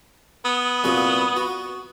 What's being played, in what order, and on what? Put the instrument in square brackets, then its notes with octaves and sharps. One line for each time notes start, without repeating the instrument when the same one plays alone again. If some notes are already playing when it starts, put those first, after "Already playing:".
[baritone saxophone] B3 [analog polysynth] D#6
[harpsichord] C2 A#2 F#4
F#4